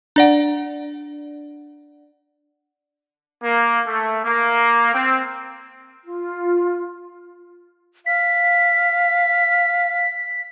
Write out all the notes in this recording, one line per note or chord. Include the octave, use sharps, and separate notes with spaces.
D4 D5 F#5
A#3
A3
A#3
C4
F4
F5 B6